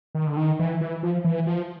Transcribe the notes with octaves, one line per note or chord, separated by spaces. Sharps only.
D#3
D3
D#3
E3
E3
F3
E3
F3